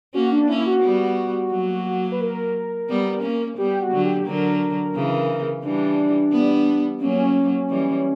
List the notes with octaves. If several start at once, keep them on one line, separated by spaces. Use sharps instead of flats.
A#3 C#4 F#4
D4
A#3 C#4 E4
F#4
G3 B3
F#3 A#3
B4
A#4
G3 B3
A#3 C#4
G3 B3 G4
F#4
D3 F#3
G4
D3 F#3 A#4
C#3 E3
E3 G3 D4
G3 B3
F#3 A#3 C#4
E3 G3